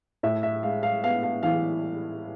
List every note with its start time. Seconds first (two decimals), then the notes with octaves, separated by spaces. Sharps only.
0.23 A2 E5
0.43 E5
0.63 G#3 F5
0.83 F5
1.03 B3 F5
1.23 F5
1.43 E3 F5